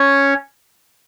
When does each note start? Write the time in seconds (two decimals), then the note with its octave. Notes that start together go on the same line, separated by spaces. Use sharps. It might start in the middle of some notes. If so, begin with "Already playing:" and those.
Already playing: C#4 C#5